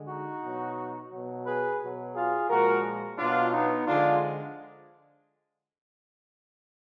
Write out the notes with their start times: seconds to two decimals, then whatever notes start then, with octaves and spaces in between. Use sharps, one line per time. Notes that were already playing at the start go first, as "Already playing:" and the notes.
Already playing: D3 G#3
0.08 D#4 F#4
0.43 B2 F#3
1.11 B2 F#3
1.46 G#4 B4
1.81 B2 F#3
2.15 F4 G#4
2.49 A#2 F3 G#3 F#4 A#4
3.18 B2 F#3 D4 F4
3.53 B3 D#4
3.87 D3 F3 G#3 D4 F4